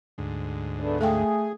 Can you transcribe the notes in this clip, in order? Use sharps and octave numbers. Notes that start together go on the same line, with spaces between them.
D2 G#2
A3 B3 D4
A3 G#4 A4 F5 G5